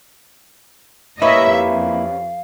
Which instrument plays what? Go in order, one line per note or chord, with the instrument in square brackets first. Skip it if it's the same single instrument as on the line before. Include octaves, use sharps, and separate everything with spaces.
[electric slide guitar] A#3 E4 [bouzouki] C#4 G4 B4 [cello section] D#5 E5 [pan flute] C#6
[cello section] F2 [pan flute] F5